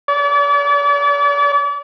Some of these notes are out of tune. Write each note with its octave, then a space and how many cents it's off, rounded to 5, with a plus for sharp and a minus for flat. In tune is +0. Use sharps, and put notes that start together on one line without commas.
D5 -40